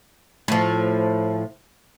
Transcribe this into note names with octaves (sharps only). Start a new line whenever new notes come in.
A2 F3